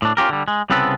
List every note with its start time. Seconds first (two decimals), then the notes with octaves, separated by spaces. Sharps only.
0.02 A2 D4
0.17 C#4 F4 G4 A#4
0.29 D3 G3
0.48 G#3
0.70 C2 C#3 B3 C4 A4 B4